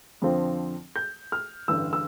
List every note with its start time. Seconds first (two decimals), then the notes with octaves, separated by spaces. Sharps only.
0.22 F2 D3 F3 C4
0.96 G6
1.32 F6
1.68 A1 G2 D3 E6
1.93 E6